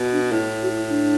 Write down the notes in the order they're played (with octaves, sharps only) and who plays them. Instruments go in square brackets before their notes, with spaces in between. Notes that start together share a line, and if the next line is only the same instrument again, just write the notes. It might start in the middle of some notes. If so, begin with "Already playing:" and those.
Already playing: [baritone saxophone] B2
[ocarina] D4
[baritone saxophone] A2 [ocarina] E4
[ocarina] F#4
E4
D4